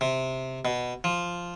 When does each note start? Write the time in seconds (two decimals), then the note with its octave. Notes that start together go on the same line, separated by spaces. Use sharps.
0.01 C3
0.65 B2
1.04 F3